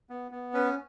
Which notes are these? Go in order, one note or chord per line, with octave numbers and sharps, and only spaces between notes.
B3
B3
C#4 B4